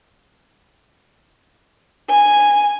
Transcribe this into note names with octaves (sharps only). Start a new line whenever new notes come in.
G#5